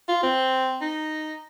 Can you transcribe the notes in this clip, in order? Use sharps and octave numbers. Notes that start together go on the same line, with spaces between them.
F4
C4
D#4